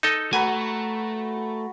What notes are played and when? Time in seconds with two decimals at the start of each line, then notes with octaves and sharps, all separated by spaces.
0.03 D#4 A4 D#5
0.33 A3 F#4 B4 G#5 A#5